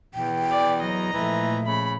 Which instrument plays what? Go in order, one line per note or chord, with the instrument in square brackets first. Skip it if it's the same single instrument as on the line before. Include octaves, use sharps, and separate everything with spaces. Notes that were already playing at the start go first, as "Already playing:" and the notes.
[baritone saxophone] E2 [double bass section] B2 E3 [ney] G5
[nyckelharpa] D5
[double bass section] F#3 [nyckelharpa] D#5 A#5
[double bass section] A#2 F3 A3 [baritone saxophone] E3 [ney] E5
[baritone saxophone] C#3 [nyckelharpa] B5